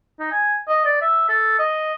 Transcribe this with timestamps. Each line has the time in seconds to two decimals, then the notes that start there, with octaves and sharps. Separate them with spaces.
0.20 D#4
0.32 G#5
0.69 D#5
0.85 D5
1.01 E5
1.29 A4
1.59 D#5